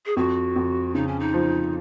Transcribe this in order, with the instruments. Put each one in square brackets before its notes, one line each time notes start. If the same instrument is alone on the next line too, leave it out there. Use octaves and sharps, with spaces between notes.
[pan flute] G#4
[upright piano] F2 [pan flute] F#4
[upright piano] F2
[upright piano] C#3 [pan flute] D#4
[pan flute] C#4
D#4
[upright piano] F3